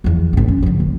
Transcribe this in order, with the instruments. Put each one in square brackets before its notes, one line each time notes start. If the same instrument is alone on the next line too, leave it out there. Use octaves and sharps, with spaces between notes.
[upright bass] E2 F3
A#1 G2
C#4
D3 F3
F#1